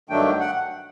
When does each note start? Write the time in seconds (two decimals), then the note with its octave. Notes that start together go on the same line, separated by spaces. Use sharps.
0.09 G2 D#3 F#3 A3 D4 G5
0.40 F#5